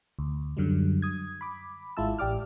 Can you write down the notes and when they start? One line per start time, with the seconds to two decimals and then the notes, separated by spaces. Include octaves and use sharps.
0.19 D2
0.57 F#2 D3 F#3 G3
1.02 D#6 G#6
1.41 B5 D6
1.97 G#1 G#3 E4 F4 A5 E6
2.19 A1 G4 D5 D6 F6